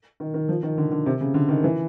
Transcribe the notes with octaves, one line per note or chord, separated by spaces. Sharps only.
D#3
D#3
F3
D#3
D3
D3
C3
C#3
D3
D#3
E3